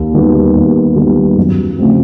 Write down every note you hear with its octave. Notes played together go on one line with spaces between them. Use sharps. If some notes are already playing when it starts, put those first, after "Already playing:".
Already playing: D#2
D#3 G3 B3
D#2
D#3 G3 B3
F#2
C#3 F3 A3 C4